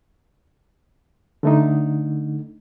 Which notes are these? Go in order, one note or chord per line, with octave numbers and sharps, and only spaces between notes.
D3 A3 D#4